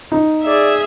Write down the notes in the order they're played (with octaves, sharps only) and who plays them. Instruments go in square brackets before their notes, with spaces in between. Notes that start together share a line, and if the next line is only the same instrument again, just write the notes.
[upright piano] D#4
[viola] G#4 E5 [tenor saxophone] D5